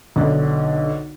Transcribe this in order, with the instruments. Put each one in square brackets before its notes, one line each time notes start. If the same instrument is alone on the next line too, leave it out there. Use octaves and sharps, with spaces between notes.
[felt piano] B1 D3